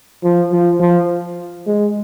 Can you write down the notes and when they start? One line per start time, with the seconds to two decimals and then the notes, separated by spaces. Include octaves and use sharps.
0.24 F3
0.52 F3
0.80 F3
1.67 G#3